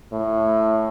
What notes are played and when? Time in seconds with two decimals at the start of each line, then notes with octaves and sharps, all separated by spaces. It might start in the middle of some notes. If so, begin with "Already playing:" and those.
0.12 A2